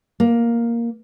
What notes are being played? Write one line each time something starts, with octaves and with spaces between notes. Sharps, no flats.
A#3